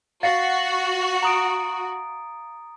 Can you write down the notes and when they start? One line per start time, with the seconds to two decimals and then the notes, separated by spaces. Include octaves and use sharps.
0.23 F#4 F5 A6 A#6 C7 C#7
1.23 A#5 D#6 D7